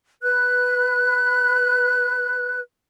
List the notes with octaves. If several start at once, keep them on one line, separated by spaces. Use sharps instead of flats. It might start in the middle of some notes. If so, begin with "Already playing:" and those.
B4 F#6